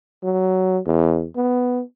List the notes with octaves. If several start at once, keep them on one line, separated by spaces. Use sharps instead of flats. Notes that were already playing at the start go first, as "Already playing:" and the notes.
F#3
E2
B3